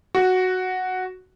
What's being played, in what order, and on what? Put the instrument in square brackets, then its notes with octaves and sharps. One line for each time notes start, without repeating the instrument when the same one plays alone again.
[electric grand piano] F#4